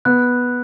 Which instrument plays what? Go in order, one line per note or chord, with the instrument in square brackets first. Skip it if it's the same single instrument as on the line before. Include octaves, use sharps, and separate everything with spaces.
[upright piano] B3 [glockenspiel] F#6